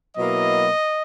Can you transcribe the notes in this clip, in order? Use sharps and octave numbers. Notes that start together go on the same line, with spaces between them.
B2 F#3 A#3 E4 D#5